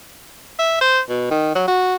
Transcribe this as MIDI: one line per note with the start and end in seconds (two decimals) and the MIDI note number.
0.59 0.79 76
0.81 1.00 72
1.09 1.27 47
1.31 1.50 51
1.55 1.64 54
1.67 1.95 66